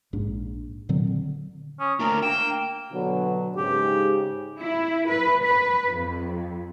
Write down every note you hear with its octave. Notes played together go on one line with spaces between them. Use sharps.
A#1 G#2 D4
A#2 D3 F#3 C4
D3
C#4 D#6
A3 D4 A#4 A#5
A#3 G5 E7
B2 D3 F#3
G#2 C#3 G4
E4
B4
B4
F2